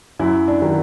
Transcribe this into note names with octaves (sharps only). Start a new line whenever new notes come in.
F#2 E4
D4
D#3 F#3